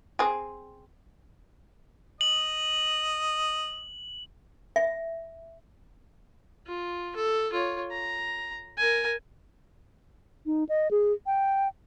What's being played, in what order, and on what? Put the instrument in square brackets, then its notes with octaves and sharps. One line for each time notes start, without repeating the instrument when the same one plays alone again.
[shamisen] C4 G#4
[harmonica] D#5 [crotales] F#7
[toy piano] E5
[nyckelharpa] F4
A4
F4 C#5
A#5
A#4 G#5
[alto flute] D#4
D#5
G#4
G5